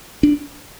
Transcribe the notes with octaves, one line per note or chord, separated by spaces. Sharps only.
D4